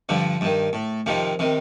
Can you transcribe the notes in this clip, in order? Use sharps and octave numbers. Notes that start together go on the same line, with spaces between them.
G2 D3 F3
G2 D#3
A2
F2 C3 D#3 F3
C3 D#3